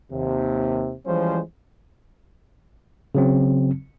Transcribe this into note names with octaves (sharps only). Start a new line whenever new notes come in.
D#2 C3
E3 F3 G3 G#3 C#4 C5
C#3 F#3 C4